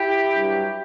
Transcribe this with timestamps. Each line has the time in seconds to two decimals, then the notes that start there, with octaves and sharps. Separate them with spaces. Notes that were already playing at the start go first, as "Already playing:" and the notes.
Already playing: E4 G4
0.32 G2 F#3